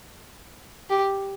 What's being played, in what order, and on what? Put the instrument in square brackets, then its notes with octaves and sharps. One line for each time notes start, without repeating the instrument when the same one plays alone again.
[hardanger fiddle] G4